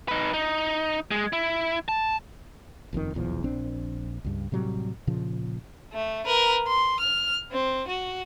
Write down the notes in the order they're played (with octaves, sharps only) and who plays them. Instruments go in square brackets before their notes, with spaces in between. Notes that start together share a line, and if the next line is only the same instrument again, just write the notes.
[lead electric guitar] D#4 B4
D#4
G#3
E4
A5
[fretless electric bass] F#1 F2 B2 D#3
D#1 B1 E2 F3
A#1 C4 D4
C#2 G2
A2 C3 F#3 G3
A#2 C#3 F3
[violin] A3
A#4 B4
C6
F6
C4
F#4